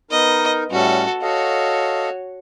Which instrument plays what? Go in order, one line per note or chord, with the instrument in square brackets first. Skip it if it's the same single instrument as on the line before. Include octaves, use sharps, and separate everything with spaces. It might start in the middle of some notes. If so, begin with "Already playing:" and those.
[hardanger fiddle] B3 D#5 [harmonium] D#4 A#4
[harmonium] A2 G3 C#4 [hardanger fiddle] F#4 A4
[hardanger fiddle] F#4 C#5 [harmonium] A4 D#5 F5